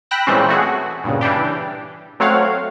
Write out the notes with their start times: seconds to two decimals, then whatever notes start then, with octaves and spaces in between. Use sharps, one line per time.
0.11 G5 B5 E6 F#6 A#6
0.27 A#2 E3 G3 G#3 C4 C#4
0.48 A3 F#4 G#4
1.04 G2 A#2 C#3
1.21 E3 G3 D4 G4
2.20 F#3 A3 C4 C#5 F5 F#5